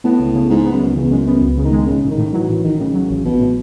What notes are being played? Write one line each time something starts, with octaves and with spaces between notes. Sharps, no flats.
A2 B3
C#2
C#3
G#2 G#3
B3
F#2
C#2
E2 C#3
F#2 G#3
F#2 B3
C#2
C#3
D#3
G#3
A1 C#3
A1
D#3
A2
E3 F#3
A1 E3
A1 D#3
A2 C#3
F#3
A1
A1 B2
A2